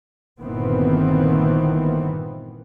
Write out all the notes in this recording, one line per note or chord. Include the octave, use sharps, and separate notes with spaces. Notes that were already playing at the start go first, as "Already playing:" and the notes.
G1 A#2 D#3 E3 B3 C4